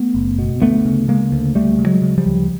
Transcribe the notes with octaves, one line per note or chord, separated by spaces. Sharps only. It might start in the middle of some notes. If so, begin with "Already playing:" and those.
Already playing: A3 B3
F#1
B2
D2 A3 B3
C#3
C#3 G#3 A#3
D2
D2 G3 A3
C#3
F#3 G#3
C#3
F3 G3
D2